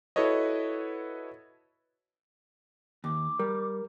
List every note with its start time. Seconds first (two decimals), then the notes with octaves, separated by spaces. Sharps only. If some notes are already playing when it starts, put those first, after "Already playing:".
0.16 E4 F#4 A4 B4 C#5 D#5
3.04 D#2 D6
3.40 G3 A#4